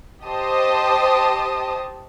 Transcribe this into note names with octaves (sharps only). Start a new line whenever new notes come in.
G4 C5 D#5 A5 D#6